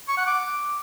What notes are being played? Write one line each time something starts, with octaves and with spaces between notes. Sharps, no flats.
C#6
F#5
D6